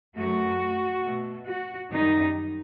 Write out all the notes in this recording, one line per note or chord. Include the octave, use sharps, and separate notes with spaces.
F#2 F#3 A3 F#4
B2 A3
F#4
F#2 D#3 G3 D#4